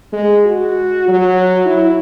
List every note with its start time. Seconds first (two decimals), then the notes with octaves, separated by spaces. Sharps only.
0.13 G#3
0.45 F#4
1.08 F#3
1.66 E4